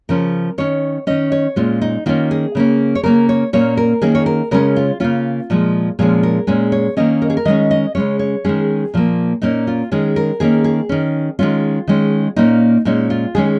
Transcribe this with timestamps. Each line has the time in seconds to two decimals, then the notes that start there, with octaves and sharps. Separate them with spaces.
0.09 C#3 F3 C#4 A#4
0.58 D#3 C#4 C#5
1.07 D#3 C#4 D#5
1.32 C#5
1.56 A#2 G#3 C#4 F4
1.82 D#4
2.06 D#3 A#3 C#4 F4
2.31 G#4
2.55 C#3 A#3 C#4
2.95 C#5
3.03 C#3 A#3 C#4 A#4
3.29 C#5
3.53 A#2 A#3 C#4 C#5
3.77 A#4
4.02 D#3 A#3 C#4 G#4
4.15 C#5
4.26 A#4
4.51 C#3 G#3 C#4 A#4
4.76 F4
5.00 C#3 A#3 C#4 F4
5.50 A#2 F3 G#3
5.99 A#2 F3 G#3 C#4 G#4
6.23 A#4
6.47 A#2 G#3 C#4 G#4
6.72 C#5
6.97 D#3 A#3 C#4 D#5
7.22 A#4
7.30 G#4
7.37 A#4
7.45 D#3 G#3 C#4 D#5
7.71 D#5
7.95 C#3 G#3 C#4 C#5
8.19 C#5
8.44 D#3 G#3 C#4 G#4
8.94 A#2 F3 A#3
9.42 A#2 A#3 C#4 D#4
9.67 F4
9.91 D#3 G#3 C#4 G#4
10.16 A#4
10.40 D#3 A#3 C#4 G#4
10.64 G#4
10.89 D#3 C#4
11.39 D#3 G#3 C#4 F4
11.87 D#3 G#3 C#4
12.36 A#2 A#3 C#4 D#4
12.85 A#2 G#3 C#4 D#4
13.10 F4
13.35 D#3 G#3 C#4 G#4